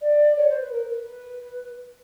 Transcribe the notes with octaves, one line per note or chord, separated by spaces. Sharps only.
D5
C#5
C5
B4
A#4
B4